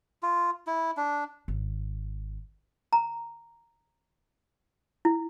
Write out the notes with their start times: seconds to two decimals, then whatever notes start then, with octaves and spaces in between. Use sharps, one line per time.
0.23 F4
0.67 E4
0.97 D4
1.48 G#1
2.93 A#5
5.05 E4